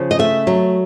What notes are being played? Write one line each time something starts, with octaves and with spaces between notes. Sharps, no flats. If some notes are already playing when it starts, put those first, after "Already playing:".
Already playing: C#3 F3
D#5
A3 E5
F#3